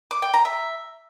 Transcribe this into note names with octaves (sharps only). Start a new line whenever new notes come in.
D6
G5
A#5
E5